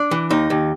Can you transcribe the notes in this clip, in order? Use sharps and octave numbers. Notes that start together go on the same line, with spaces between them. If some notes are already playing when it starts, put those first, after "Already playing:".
Already playing: D4
E3
D#2 D#4
D#2